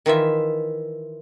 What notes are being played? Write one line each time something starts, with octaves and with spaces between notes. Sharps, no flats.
D#3 E3 F4 E5